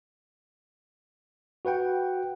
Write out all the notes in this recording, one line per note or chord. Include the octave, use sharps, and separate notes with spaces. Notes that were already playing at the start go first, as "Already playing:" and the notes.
F#4 B4 F#5 G5